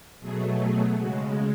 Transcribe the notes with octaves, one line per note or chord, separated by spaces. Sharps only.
B2 F#3 A3 G#4
G#4
C#3 G#3 F#4